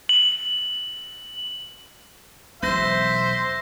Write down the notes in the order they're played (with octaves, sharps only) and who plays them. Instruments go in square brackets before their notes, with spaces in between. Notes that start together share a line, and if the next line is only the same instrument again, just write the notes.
[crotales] F#7
[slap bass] E1 B1 [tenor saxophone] C5 [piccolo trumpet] E5 [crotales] G6 A#6